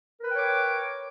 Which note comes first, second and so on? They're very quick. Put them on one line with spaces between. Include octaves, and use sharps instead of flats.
A#4 B4 G5 C#5 D6